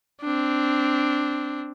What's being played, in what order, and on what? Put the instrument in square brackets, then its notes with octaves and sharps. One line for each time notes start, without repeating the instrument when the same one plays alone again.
[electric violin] C4 D4